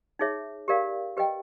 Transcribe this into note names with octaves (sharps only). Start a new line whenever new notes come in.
D#4 G#4 C#5 E5
G4 A#4 D5 F5
G4 B4 D#5 G5